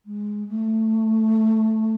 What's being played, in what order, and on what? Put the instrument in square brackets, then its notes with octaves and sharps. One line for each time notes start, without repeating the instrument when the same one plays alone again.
[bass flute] G#3
A3